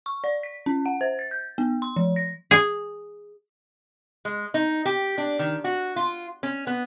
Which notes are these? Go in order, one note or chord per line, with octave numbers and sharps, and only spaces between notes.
C#6
D5
B6
C#4
F#5
C5
A6
G6
B3
C6
F3
A#6
G#4
G#3
D#4
G4
D4
D#3
F#4
F4
C#4
B3